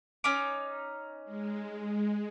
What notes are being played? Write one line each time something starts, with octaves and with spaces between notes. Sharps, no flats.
C#4 D#4 D6
G#3